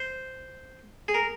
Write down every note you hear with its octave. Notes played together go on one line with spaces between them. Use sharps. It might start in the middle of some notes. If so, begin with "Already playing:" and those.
Already playing: C5
G#4
A#4